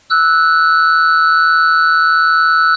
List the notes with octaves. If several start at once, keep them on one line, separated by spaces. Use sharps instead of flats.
E6 F#6